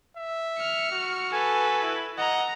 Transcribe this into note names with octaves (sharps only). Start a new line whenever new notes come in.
E5
F6 C#7
F#4
A4 B4 G#5
E4
D#5 F#5 A#5